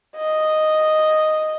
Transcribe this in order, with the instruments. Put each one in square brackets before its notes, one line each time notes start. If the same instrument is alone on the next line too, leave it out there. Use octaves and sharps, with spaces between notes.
[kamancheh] D#5